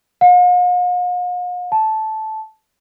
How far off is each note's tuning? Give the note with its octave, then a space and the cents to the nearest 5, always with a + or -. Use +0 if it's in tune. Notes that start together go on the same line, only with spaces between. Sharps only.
F5 +45
A5 -10